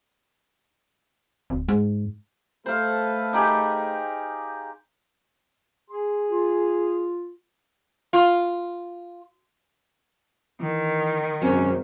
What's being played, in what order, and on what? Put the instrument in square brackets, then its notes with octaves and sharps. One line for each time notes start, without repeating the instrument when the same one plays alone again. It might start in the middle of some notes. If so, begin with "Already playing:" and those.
[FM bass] D1
G#2
[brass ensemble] A3 A4 B4 [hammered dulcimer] C5 F5
[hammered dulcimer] D#4 G4 G#4
[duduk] G#4 [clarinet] C6
[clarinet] F4
[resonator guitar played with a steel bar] F4
[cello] D#3 [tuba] E3
[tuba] G#1 [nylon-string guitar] F#2 C3 F#3 [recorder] C#4